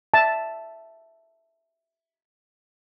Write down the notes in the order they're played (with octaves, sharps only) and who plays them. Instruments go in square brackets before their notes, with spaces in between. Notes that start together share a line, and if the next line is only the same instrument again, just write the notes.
[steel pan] E5 A5